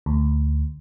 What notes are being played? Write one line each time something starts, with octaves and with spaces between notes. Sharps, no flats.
D2